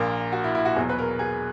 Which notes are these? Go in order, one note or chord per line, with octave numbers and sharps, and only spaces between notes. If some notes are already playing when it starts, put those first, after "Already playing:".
Already playing: A#1 A#2 A#3
F#4
E4
E4
F#4
E2 B2 F#3 G#4
B4
A#4
G#4